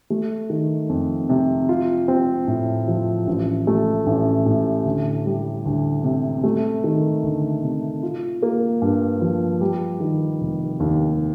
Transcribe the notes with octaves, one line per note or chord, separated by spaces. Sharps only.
A3
D#3
F2
C3
F4
C4
A2
F3
A1
A3
A1
A2
D2
G3
D2
C3
A3
D#3
D2
C3
F4
A#3
G2
F3
G3
D#3
F1
D#2